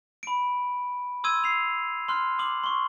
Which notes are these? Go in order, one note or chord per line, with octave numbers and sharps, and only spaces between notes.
B5 D7
C6 D#6 E6 G#6 D#7
C7 F7
C6 F6 F#6
C6 D6 D#6 F#7
C6 C#6